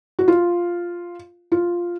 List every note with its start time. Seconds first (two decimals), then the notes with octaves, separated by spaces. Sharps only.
0.19 F#4
0.28 F4
1.52 F4